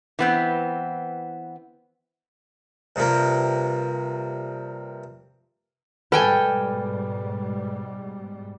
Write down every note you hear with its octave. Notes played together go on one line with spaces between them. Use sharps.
E3 B3 C4
G2 C3 F3 A#3
G#2 B2 G3 A4 B4 G5 G#5 F6